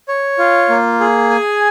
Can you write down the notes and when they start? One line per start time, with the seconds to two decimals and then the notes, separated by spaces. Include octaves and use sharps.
0.08 C#5
0.38 F4
0.69 A#3
1.00 G#4
1.30 G#5